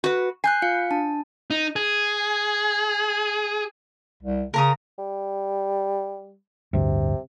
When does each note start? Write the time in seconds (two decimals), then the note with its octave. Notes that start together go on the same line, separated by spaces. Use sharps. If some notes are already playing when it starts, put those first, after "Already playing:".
0.04 F#4 B4
0.44 G#5 F#6 G6 C7
0.62 F4 F5 C#7
0.91 D4 A5
1.50 D#4
1.76 G#4
4.23 C2
4.54 C#3 A#4 A#5 D#6
4.99 G3
6.73 A1 D2 G2 C3